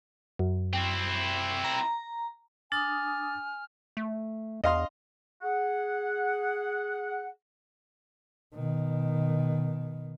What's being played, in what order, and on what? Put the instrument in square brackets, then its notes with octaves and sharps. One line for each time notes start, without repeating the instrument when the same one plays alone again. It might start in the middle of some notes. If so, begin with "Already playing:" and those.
[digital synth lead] F#2
[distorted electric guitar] C4 E4
[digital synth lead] A#5
[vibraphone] D4 D#6 [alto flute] G#5 [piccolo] F6 [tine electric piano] A6
[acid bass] A3
[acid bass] E2 [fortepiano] D#5 F5 C6
[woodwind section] G#4 F#5
[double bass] B2 D#3